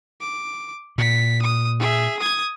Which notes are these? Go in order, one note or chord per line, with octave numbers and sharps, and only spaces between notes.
D6
A#2 B6
D#6
G#4 E5
D#6 G#6